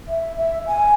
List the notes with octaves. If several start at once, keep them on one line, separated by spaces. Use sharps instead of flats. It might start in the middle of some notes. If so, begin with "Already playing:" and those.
E5
E5
G#5